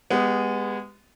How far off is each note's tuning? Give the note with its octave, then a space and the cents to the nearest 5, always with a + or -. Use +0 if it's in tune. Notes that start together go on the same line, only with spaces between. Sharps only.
G#3 -20 B3 +5 G4 +0